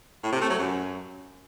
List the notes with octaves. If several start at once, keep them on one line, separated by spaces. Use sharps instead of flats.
A2
C3
A3
F#3
F#2